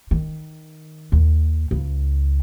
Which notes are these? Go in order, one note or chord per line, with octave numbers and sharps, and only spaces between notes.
D#3
D#2
C#2